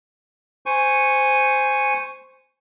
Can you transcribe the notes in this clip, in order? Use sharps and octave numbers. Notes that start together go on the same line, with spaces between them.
C5 G#5 C#6